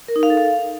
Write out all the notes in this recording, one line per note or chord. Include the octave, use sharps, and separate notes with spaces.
A#4
D#4
F5
A4
F5